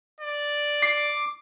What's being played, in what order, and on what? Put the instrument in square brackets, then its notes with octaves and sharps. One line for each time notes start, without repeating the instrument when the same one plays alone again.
[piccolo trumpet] D5
[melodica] D6 [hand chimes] C7